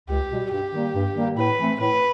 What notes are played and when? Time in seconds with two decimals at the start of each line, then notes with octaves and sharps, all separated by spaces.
0.09 C#2 G4
0.31 B2 G3
0.51 G2 G4
0.73 D#3 G3 A#3
0.94 G2
1.16 D#3 G3 A#3
1.37 A2 B4
1.59 E3 A3 C4
1.80 A2 B4